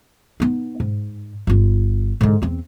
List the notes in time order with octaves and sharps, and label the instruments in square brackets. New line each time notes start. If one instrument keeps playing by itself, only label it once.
[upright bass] B3 D#4
G#2
G1 F4
G#2 D3
E2 C4